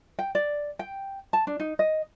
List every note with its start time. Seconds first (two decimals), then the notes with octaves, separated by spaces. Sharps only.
0.19 G5
0.35 D5
0.79 G5
1.33 A5
1.47 D4
1.60 D#4
1.79 D#5